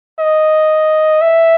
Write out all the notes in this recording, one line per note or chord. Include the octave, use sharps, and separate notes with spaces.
D#5
E5